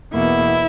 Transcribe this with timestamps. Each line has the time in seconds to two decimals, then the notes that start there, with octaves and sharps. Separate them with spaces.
0.12 E2 B2 A#3 E4 E5